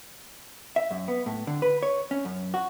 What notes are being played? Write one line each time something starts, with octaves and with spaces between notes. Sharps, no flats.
E5
F#2
B3
A2
D3
B4
C#5
C#4
F#2
F#4